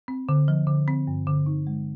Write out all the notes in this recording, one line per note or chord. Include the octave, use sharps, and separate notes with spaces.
C4
D3
F3
D3
C4
G2
D3
D#4
G#3